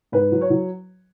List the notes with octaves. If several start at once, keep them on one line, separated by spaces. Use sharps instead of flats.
G#2 B4
F#3
C#5
F#3